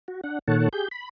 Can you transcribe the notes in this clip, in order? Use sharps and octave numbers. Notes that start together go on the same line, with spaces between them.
F#4
D4 F#5
A#2 D#3 A4 C#5 F#5 A5
G4 G#4 G6
B5